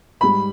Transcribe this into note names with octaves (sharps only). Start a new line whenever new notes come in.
G#2 G3 B5